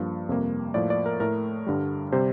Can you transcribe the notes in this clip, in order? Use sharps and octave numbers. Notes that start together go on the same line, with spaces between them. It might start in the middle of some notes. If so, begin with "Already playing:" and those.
Already playing: G2 F3 A#3
F2 C3 G3 A#3
A2 F3 A#3 D5
D5
A#4
A2 A3 A#4
G2 D3 G3
C3 G3 C5